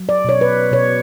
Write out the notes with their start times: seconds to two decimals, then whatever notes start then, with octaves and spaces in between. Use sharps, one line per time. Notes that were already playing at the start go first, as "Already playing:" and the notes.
Already playing: F#3
0.09 D5
0.24 B2 C#5
0.41 B4
0.72 B2 C#5